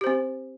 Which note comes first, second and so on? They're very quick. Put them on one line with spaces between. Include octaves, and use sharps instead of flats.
G4 C5 C4